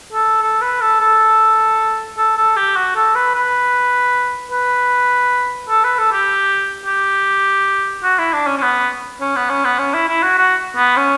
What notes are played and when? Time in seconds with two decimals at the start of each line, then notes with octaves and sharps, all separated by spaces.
0.13 A4
0.42 A4
0.61 B4
0.81 A4
1.01 A4
2.18 A4
2.37 A4
2.56 G4
2.76 F#4
2.96 A4
3.15 B4
3.35 B4
4.51 B4
5.69 A4
5.84 B4
5.98 A4
6.13 G4
6.86 G4
8.03 F#4
8.18 E4
8.33 D4
8.47 C#4
8.58 C#4
8.62 B3
9.21 C#4
9.36 B3
9.50 C#4
9.65 B3
9.79 C#4
9.94 E4
10.08 E4
10.23 F#4
10.38 F#4
10.76 B3
10.96 C#4